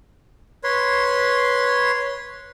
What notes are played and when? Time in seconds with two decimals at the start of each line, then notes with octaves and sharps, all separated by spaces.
0.64 B4 C#5 C6